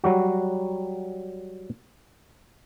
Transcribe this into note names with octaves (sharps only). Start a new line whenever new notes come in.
F#3 G3 F#4